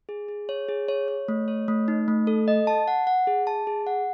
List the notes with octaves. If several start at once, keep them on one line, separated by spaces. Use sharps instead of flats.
G#4
G#4
C#5
G#4
C#5
C#5
A3
C#5
A3
D#4
A3
A4
D#5
A5
F#5
F#5
G#4
A5
G#4
F#5